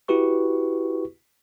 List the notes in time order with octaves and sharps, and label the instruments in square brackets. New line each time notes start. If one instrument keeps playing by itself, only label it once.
[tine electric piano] E4 F#4 G4 B4 C#6